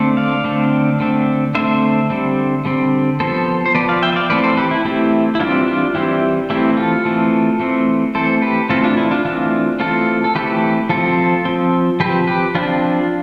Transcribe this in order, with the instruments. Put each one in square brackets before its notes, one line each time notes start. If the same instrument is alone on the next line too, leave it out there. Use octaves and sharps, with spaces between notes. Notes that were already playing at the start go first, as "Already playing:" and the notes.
Already playing: [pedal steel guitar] D3 A3 C4
D5 F5
D3 A3 C4
D3 A3 C4
D3 A3 C4 C5 E5
D3 G3 C4
D3 G3 C4
F3 B3 A4 C5
C5
F3 B3 B4 D5
D5 F5
E5 G5
E5
D5 F5
E3 A3 C4 B4 D5
A4 C5
G4 B4
E4
E3 A3 C4 E4 G4
E4
E3 G3 C4 D4 F4
D4 F4
E3 G3 C4 E4 G4
E3 A3 C4 E4 G4
F4 A4
E3 A3 C4
E3 A3 C4
E3 A3 C4 A4 C5
G4 B4
E3 A3 C4 F4 A4
D4 F4
E4
D4 F4
E3 A3 C4 D4 F4
E3 A3 C4 F4 A4
A4
E3 A3 C4 G4 B4
F3 C4 F4 A4
F3 C4
F3 C4 G4 B4
G4 B4
F3 C4 D4 F4